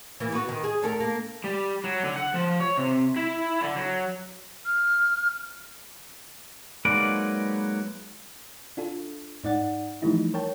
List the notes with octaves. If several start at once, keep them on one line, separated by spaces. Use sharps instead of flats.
E3 A#3
B3 F#4
D#3
G#4
D2 A4 A#4
A#3
G3
F#3
D3
F#5
F3
C#5
C3
E4
D3
F#3
F6
F#3 G#3 A#3 D#4 B4 D5
D4 F4 A4
G#2 D#4 D5 F#5 A6
E3 F3 G3 A3 D#4 E4
A#4 C#5 G5 A5